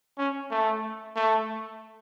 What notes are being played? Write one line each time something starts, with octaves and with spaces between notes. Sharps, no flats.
C#4
A3
A3